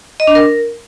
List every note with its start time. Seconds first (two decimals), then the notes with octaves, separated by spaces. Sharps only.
0.20 D#5
0.27 D4
0.35 A#4